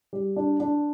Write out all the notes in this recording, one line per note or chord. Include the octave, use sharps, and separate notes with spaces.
G3
D4
D4